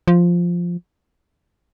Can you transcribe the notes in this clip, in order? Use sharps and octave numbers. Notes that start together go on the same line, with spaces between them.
F3